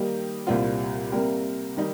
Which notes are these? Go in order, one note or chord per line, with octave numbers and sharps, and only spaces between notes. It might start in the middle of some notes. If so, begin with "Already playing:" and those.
Already playing: D#3 G3 A#3 D#4 G4
C2 A#2 G3 C4 F4
C3 G3 A#3 G4 A#4
D#3 G3 D#4